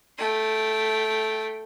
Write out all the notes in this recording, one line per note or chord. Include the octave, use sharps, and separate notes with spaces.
A3 G5